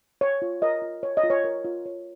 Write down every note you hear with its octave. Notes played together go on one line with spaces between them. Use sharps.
C#5
F4
A#4 D#5
F4
C#5
D#5
F4
C#5
A#4
F4
C#5